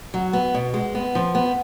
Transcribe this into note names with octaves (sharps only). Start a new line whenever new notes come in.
F#3
B3
B2
G#3
B3
F3
B3